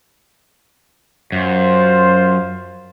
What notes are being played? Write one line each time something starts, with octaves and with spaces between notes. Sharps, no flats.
F#2 F4 C5